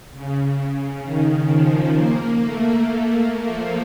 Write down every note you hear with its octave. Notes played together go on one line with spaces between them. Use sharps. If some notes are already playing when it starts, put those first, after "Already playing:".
C#3
D#3
F3
A#3
A3
A#3
A3
F3